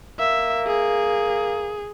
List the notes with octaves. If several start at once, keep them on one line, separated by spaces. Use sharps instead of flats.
A#3 E5
G#4